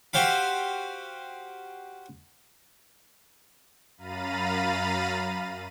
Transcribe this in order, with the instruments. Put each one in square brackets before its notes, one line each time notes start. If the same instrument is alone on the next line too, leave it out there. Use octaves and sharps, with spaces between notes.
[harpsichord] F#4 G4 C5 F5 B5
[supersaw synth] F#2 F5 A#5 B5 A6 D#7